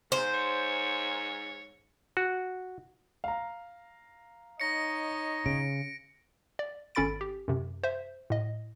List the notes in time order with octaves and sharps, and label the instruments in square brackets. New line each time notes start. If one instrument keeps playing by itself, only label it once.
[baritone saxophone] G#2 [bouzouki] C5
[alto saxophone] C#5
[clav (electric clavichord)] F#4
[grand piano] F5 A#5
[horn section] D#4 C#5 D#5 [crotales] A#6 C#7
[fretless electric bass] C#3 [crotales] D7
[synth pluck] D5
G#1 C#4 A4 B5 A6 D7
G4
F#2 C3
C5 E5
A2 D#5